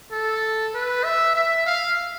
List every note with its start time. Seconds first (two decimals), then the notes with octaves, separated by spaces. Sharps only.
0.12 A4
0.74 B4
1.04 E5
1.35 E5
1.66 F5